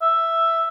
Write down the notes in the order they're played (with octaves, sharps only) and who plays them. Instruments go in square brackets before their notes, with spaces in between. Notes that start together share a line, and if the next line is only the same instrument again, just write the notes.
[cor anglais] E5